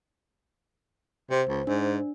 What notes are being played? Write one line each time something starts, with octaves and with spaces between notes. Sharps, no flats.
C3 C5
C#2
G#2 D4